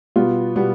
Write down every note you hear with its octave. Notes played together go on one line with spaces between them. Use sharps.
B2 G3 B3 F4
B2 G3 B3